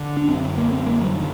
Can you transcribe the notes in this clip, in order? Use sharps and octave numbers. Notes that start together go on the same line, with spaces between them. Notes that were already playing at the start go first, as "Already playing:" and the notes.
Already playing: D3
D4
F#2 D3 C4
A#3
C4
A#3
F#3
D#3